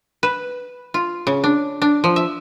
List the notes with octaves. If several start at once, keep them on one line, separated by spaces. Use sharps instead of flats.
B4
F4
C#3
D4
D4
F3
E5